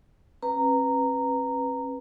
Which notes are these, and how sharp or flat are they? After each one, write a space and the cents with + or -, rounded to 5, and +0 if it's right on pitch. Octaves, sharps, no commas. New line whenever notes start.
C#4 -45 B4 +0 A#5 -10